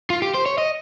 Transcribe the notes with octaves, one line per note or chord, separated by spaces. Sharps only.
F4
G4
C5
C#5
D#5